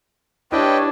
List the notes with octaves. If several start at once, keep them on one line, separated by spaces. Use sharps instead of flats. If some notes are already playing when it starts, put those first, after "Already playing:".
D4 E4 G4 B4 C#5 D#5 G5